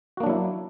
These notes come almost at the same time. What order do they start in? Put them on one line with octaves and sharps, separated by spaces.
F#4 A#3 D4 F#3 E4